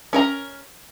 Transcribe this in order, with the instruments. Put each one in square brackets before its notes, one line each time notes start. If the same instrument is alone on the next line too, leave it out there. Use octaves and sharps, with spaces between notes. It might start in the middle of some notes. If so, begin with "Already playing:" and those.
[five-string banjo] C#4 A#4 A#5